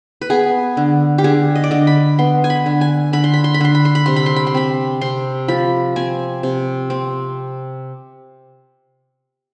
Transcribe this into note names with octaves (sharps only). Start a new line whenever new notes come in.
B4
B3 G#4
D3
G4
D3 G#4
D#5
D5
D3 D#5
B5
B3 C6
G#5
B5
D3
G#5
D3 B5
C6
B5
C6
B5
D3 C6
B5
C6
B5
C3 C6
B5
C6
B5
C6
C4 B5
C3 C6
F3 B5
C4 G#5
C3
C4